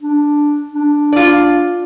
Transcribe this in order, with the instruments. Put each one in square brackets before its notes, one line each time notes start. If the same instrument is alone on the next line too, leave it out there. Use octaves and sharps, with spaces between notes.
[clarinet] D4
D4
[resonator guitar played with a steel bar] F4 D5